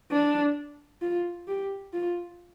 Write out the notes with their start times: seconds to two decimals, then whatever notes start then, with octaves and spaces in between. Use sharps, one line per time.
0.11 D4
1.01 F4
1.48 G4
1.93 F4